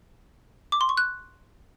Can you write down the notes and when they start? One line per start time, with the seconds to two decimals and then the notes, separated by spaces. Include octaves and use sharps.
0.72 D6
0.81 C6
0.89 C#6
0.97 F#6